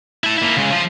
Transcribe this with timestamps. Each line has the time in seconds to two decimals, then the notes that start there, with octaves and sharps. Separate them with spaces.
0.24 E4 A5
0.38 A#3 E4
0.57 C#3 G#3
0.72 F3